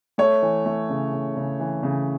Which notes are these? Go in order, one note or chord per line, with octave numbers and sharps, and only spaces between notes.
A3 C#5
E3
A3
C#3
C#3
C#3
E3
C#3